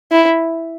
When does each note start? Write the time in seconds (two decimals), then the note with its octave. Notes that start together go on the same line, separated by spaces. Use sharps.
0.12 E4